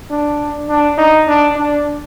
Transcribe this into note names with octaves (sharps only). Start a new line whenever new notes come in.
D4
D4
D#4
D4
D4